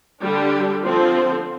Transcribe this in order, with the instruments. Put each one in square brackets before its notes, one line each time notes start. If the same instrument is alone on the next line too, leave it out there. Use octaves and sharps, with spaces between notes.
[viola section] D3 G3 D4 G4
D3 F3 C4 F4 C5